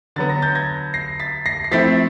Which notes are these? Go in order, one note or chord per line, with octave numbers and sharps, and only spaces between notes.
D3 F#3 B3 A6
A#6
G6 A6
G#6 A#6
A#6 C7
A6 B6
A#6 C7
C7
F3 A3 C4 E4 A6 B6